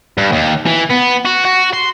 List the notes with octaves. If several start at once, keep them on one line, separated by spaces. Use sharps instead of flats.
G2
D#2
E3
B3
F#4
F#4
C6